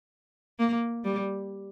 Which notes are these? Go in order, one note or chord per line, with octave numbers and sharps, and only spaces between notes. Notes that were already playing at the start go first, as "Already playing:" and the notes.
A#3
G3